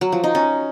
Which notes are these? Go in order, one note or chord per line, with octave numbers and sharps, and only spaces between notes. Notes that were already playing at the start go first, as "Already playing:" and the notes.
F#3
F3
D#4
C#4